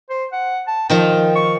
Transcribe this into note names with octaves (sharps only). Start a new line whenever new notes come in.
C5
F#5
A5
D#3 F3 F4 G5
C#6